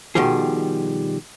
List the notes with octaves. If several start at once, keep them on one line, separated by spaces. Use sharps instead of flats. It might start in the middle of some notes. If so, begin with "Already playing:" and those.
B2 D#3 F3 G3 G#4